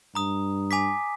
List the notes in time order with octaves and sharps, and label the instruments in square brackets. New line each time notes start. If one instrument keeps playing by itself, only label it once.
[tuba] G2 [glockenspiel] A#5 D#6
[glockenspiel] G#5 D6 B6